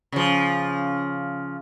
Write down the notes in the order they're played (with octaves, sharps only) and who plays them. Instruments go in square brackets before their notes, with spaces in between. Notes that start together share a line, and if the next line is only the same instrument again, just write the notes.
[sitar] C#3 F3